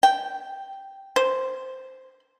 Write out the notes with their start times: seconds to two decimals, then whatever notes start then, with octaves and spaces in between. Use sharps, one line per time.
0.03 G5
1.16 C5